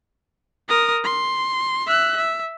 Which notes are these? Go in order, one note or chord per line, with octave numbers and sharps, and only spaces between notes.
A#4 D#6
C6
E5 F#6
E5